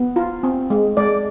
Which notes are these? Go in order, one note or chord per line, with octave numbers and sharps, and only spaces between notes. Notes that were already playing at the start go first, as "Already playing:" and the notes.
Already playing: B3
F4
C4
G#3
G#3 D5